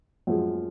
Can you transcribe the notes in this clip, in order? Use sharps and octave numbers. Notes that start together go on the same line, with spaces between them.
F#2 F3 G#3